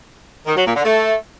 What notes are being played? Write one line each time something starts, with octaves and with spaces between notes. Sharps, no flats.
D#3
F#3
A#2
D3
A3